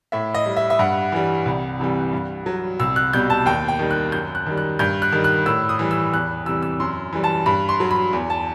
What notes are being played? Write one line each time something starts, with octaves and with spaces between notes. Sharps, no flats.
A2 E5
D#5
G3
E5
E5
G2 F#5
E3 G3
C2
C3 E3 G3
G2
F#3
C2 E6
F#6
B2 G3 G6
A5
D#2 G5
G5
D#3 G3
F#6
F#2 G6
F#6
D#3 G3
F#6
G2 G6
F#6
D#3 G3
F#6
A2 E6
D#6
E3 G3
E6
E2 F#6
C3 E3 G3 E6
E6
F#2 C6
E3 G3
A5
G2 B5
C6
F#3
B5
E2
A5